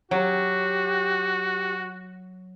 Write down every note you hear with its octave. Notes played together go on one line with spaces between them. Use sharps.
F#3 F#4 G4